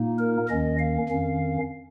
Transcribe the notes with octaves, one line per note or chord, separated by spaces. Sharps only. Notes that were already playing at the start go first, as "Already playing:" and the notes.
Already playing: A#2 A#3 D#4
A#4
D#2 D#3 C#4 D#5
F5
F2 D#3 C#4